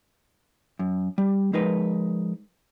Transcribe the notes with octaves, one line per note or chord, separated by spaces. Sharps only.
F#2
G3
F3 G#3 D#4 A#4 B4